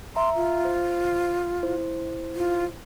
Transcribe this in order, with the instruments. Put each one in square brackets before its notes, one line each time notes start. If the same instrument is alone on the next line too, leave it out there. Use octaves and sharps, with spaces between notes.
[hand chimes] E5 A#5 [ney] C6
[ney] F4
[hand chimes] C5
E4 C5
[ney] F4